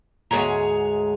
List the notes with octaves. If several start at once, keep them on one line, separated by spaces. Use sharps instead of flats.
D2 G#2 G#3 G#4 C#5 A#5